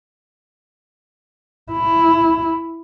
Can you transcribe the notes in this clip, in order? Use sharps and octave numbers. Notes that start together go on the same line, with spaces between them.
E4